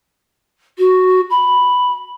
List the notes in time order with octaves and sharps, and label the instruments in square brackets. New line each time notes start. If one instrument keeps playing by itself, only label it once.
[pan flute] F#4
B5